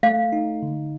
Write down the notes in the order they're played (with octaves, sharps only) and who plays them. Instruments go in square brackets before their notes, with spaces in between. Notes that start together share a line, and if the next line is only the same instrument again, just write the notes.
[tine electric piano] A3 [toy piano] F5
[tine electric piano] D#4
D3